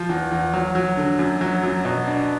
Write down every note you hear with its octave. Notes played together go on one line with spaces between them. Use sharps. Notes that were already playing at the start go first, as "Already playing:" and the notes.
Already playing: F3
E2
E2
F#3
F#3
D3
F#2
F#3
F#2
B2
D4